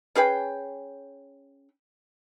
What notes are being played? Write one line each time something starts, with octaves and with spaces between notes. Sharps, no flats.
C#4 G#4 B4 G5